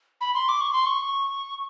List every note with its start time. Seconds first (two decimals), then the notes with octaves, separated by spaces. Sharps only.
0.21 B5
0.34 C6
0.49 D6
0.61 C#6
0.73 C6
0.86 C#6